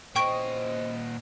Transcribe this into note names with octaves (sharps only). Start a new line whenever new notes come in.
E2 A#2 C#3 C5 D#5 G5 C#6 D7